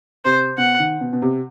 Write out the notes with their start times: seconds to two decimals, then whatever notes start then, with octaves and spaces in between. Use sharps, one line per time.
0.25 C3 C5
0.58 B2 F#5
0.79 D#3
1.01 B2
1.13 B2
1.22 C3